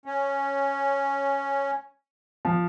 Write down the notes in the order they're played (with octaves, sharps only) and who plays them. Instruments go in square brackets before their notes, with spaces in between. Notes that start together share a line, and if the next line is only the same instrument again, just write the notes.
[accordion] C#4
[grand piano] F3